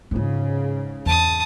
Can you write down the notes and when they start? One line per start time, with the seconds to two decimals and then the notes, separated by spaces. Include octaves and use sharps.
0.11 G#2 C#3 D4 F4
1.06 E2 A5 D#6